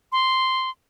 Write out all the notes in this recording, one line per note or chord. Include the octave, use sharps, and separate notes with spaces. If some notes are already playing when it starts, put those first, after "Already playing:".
C6